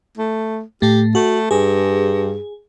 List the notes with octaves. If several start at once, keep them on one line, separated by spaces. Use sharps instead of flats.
A3
A2 A3 G4
A3 F#4
G2 G#4